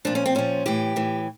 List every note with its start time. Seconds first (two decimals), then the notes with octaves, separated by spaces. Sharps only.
0.05 A#2 F3 D4
0.15 C#4
0.26 C4
0.35 A#2 F3 C#4
0.66 A2 E3 G4
0.96 A2 E3